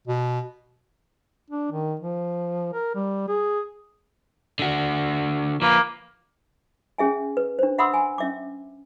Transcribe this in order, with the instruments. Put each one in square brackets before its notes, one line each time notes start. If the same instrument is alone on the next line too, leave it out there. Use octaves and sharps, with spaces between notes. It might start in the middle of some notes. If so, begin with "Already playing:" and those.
[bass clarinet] B2
[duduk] D4
D#3
F3
A#4
G3
G#4
[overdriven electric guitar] D3 F#4
[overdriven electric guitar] F3 B4 [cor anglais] A#3
[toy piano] C#4 G#4 E5 G#5
B4
D4 C5
E5 F#5 B5 C6 D#6 E6
G#5
C#4 E5 D6